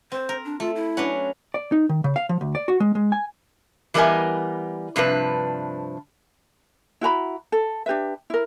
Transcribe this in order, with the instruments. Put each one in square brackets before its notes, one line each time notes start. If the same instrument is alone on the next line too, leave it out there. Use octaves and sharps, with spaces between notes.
[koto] C4 [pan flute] C5
[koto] A#4
[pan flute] D4
[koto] A3 [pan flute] F4
[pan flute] E4
[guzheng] F#3 C#4 [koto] D4 B4 F#5
[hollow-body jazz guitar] D5
D#4
D#3
C#3
F5
F3
D2
D5
F#4
G#3
G#3
G#5
[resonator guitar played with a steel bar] E3 G3 B3 A#4 D#5 G#5
G2 C3 F3 D4 B4
[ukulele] E4 F#4 A#5 B5
A4
D4 G4 B4 E5
E4 A#4